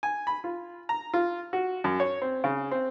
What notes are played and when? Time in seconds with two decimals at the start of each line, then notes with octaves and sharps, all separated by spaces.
0.03 G#5
0.27 B5
0.44 F4
0.89 A#5
1.14 F4
1.53 F#4
1.84 F#2
2.00 C#5
2.22 C4
2.44 C#3
2.71 C4